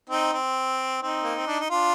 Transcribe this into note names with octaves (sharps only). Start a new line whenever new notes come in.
C4 D#4
C4
C4 D#4
A#3
C4
D4
D#4
D4 F4